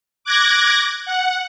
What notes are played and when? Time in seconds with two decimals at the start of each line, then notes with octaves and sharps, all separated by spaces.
0.24 D6 F#6 G#6 A#6
1.06 F#5